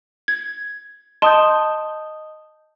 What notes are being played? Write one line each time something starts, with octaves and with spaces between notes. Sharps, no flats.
G#6
D#5 A5 C6 D#6 G6